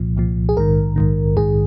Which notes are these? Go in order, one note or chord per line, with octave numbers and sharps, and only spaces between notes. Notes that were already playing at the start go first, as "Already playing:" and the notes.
Already playing: C2 A#2 F3
C2 A#2 F3
G#4
A#1 G#2 D#3 A#4
A#1 G#2 D#3
A#1 G#2 D#3 G#4